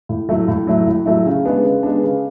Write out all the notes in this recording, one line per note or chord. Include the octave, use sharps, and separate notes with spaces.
A2
F#3 A3 E4
A2
F#3 A3 E4
A2
F#3 A3 E4
C#3
G#3 B3 D4
C#3
G#3 B3 D4
C#3